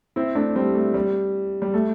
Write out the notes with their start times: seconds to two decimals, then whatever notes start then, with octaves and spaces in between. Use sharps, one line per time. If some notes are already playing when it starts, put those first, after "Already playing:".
0.16 C4 E4
0.35 A3 D4
0.56 G3 C4
0.74 A3
0.94 G3
1.62 G3
1.74 A3